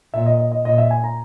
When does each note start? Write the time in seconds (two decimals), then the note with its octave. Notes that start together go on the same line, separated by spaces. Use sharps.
0.14 A#2 E5
0.26 D#5
0.39 D#5
0.52 D#5
0.65 A#2 D#5
0.78 E5
0.91 G#5
1.04 A#5